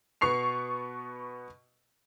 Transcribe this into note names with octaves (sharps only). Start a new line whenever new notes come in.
B2 B3 C#6 C7 F7